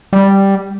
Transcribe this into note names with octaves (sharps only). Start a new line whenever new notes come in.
G3